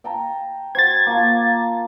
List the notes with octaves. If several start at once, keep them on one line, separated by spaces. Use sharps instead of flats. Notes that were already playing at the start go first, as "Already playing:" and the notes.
G5 A5 A#5
F#4 C5 G#6 A6
A#3 F4 A5